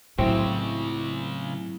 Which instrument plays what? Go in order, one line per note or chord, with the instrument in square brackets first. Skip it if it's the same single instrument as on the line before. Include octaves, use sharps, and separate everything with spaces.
[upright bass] A2 [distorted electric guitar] C#3 G#3 [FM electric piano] F#3 E4 [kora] C4